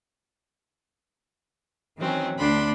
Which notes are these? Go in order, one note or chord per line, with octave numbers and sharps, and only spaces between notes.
D#3 E3 F#3 C4 C#4
D2 D3 D4 B5 C6